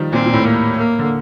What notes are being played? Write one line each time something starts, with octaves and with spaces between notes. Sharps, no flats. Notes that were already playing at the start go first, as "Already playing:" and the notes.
Already playing: D#3 F3 G3
A#2 C4
A#2
A2
A#3
A#3
D3